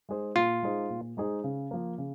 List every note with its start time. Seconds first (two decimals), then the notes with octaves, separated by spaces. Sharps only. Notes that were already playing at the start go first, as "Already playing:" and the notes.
0.09 G#3 D#4 G#4 C5
0.36 A#2 F4
0.63 G#3 D#4 G#4 C5
0.90 A#2
1.17 G#3 D#4 G#4 C5
1.44 C#3
1.71 F3 A#3
1.98 C#3